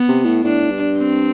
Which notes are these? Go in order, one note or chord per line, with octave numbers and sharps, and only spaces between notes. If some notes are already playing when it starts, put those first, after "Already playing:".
Already playing: B3
C3
A2
A2 D4
G2
C4